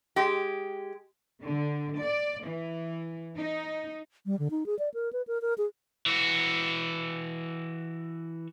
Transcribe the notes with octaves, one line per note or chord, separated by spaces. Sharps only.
G#3 G4
D3
D5
E3
D#4
G3
D3
D#4
G#4
D5
A#4
B4
A#4
A#4
G#4
E3 F#4